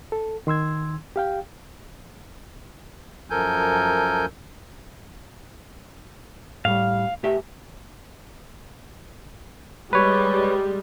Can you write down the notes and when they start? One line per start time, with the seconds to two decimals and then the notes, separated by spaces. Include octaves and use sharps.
0.12 A4
0.47 D#3 C6 E6 G#6
1.16 G4 F5 G5
3.30 F#2 F3 A4 A#4 G#5 G6
6.65 A2 G3 F5
7.23 A3 G4 E5
9.93 G3 G#3 B4 C#5